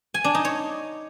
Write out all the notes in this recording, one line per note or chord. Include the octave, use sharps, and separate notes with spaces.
G#5
D4
D#4
C#5